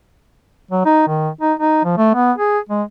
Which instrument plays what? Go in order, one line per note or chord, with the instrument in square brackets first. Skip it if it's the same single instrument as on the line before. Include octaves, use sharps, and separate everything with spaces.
[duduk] F#3
D#4
D#3
D#4
D#4
F3
A3
B3
G#4
G#3